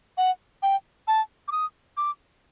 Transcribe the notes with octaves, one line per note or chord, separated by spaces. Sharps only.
F#5
G5
A5
D6
D#6
D6